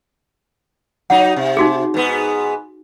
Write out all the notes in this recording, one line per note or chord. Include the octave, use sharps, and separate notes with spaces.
F#3 D#4 F#5
C3
D#4 F#4 G#4
G#2 B3